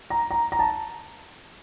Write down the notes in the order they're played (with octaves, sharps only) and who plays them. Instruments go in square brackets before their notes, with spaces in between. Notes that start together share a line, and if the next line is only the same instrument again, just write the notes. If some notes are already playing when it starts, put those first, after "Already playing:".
[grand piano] A#5
A#5
A#5
A5